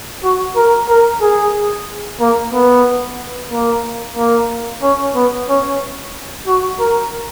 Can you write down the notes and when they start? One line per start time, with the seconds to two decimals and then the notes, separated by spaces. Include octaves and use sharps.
0.24 F#4
0.56 A#4
0.89 A#4
1.22 G#4
2.20 A#3
2.53 B3
3.51 A#3
4.17 A#3
4.82 C#4
5.15 B3
5.49 C#4
6.47 F#4
6.80 A#4